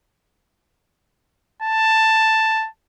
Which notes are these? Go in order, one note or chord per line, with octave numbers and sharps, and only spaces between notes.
A5